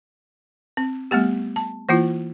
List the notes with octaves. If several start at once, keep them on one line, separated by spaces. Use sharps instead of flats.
C4
G3 A3 B3 G4
A5
E3 A#3 E4 F4